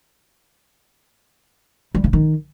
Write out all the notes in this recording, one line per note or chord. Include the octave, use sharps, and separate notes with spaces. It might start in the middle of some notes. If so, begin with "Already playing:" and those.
G3
C#3
D#3